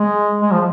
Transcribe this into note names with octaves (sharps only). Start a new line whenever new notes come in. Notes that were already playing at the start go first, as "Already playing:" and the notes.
Already playing: G#3
G#3
F3